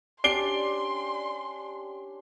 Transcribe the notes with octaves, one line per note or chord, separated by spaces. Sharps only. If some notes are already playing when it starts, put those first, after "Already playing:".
C#4 D4 G4 D5 C6 C7 D7 G7